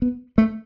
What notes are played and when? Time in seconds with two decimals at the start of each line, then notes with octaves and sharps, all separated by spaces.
0.02 B3
0.38 A3